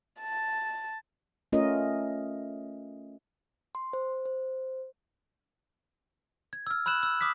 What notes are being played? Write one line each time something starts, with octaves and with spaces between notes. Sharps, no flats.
A5
A3 C#4 F4 A#4 C#5 D#5
C6
C5
C5
G#6
E6 F6
B5 E6 F#6 E7 F#7
E6
D6 D#6 F6 B6